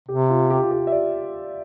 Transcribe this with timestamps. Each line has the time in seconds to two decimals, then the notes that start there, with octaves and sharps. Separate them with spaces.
0.09 C3 G4
0.30 F4
0.50 G4
0.62 F4
0.71 G4
0.87 E5
0.92 D5